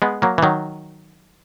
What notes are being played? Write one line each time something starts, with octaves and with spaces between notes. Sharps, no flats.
G#3 B3
F#3 A#3
E3
D#3 F#3